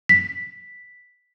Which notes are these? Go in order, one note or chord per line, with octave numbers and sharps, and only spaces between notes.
B6